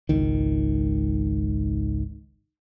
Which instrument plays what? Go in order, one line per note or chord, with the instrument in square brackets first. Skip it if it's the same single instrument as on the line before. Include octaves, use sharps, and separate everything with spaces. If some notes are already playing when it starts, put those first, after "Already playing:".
[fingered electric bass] G#1 C#2 D#3